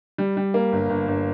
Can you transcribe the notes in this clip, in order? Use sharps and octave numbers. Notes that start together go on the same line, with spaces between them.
G3
G3
A#3
G1
G1
G1